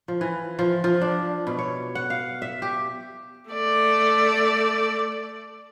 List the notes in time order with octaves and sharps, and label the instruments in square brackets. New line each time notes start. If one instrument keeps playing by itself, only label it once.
[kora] F3
E3
F3
F3
D4
B2
C#5
F#5
F5
E5
G4
[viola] A3 D5